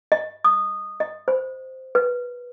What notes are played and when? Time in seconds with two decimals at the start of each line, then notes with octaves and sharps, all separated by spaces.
0.12 D#5
0.44 D#6
1.00 D#5
1.28 C5
1.95 B4